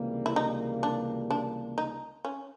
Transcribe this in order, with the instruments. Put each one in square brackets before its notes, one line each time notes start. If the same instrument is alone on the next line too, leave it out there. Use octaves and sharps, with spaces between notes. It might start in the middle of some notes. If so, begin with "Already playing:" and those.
Already playing: [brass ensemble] C#2 C3 E3 G3 A#3
[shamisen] E4
D#4
D4
D4
D#4
C#4